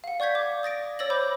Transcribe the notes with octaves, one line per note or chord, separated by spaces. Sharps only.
F5 F#5
D5 C#6 G6 G#6 B6
D6
D#6 A6 A#6 D7
C#5 E6 A6 A#6 F#7
C5 B5 D6 G6